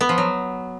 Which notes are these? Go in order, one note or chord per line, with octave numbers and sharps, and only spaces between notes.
B3
F3
F#3